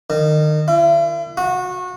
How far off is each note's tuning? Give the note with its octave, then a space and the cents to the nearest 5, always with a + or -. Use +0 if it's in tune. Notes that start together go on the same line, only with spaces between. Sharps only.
D#3 -30
E4 +45
F#4 -25